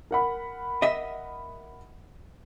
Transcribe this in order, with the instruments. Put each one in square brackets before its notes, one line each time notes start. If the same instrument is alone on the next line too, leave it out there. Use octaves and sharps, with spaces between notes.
[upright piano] A#4 F#5 B5
[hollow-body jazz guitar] D#5 E5